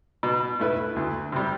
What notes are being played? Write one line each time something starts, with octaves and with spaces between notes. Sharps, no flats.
B2
A3 E4 B4
D2
C3 G3